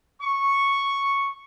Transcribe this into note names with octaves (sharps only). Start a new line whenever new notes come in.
C#6